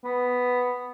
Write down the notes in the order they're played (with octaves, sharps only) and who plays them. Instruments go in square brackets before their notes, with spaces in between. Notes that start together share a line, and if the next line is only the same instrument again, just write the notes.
[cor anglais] B3